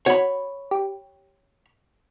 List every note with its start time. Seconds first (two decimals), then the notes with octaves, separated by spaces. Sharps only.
0.06 F#4 C#5 B5
0.71 G4